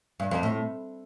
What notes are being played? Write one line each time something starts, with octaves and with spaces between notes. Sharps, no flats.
G2
F2
A2